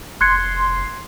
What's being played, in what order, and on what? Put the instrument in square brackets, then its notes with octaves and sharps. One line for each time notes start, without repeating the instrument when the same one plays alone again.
[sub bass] F1 [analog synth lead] C6 [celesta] F#6 G#6 C#7